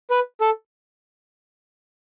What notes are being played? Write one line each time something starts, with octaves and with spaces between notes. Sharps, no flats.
B4
A4